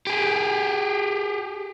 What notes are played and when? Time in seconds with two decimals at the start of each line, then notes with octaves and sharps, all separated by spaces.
0.07 G4 G#4